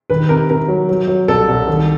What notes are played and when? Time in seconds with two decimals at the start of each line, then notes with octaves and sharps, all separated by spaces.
0.10 D#3 B4
0.29 C3 A#4
0.50 C3 A#4
0.68 F#3
0.89 F#3
1.08 F#3
1.28 C2 A4
1.48 C2
1.67 D#3